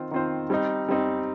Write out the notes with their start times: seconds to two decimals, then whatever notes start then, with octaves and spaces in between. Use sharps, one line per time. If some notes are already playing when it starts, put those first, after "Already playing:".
Already playing: D#3 C4 F4 C5
0.11 D#3 C4 F4 C5
0.50 G3 C4 D#4
0.89 G3 C4 D#4